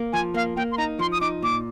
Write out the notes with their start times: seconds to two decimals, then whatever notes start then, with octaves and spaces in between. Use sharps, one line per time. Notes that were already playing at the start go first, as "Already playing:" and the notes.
Already playing: A#3
0.13 F3 G#5
0.34 A#3 F5
0.57 A#3 G5
0.72 C6
0.78 D#4 A#5
0.99 F3 C6
1.12 D#6
1.21 D#4 D6
1.42 A#2 D6